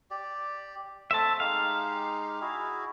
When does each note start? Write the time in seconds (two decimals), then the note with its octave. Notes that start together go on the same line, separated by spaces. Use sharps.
0.11 G4 D5
1.11 A3 C4 E5 A5
1.40 G#3 D#4 G4 F5
2.41 E4 F#4 G#4